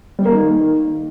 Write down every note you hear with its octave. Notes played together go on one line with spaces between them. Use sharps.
G3
A#3
D#3